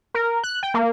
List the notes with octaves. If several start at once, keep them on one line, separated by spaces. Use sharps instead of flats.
A#4
F#6
G5
A#3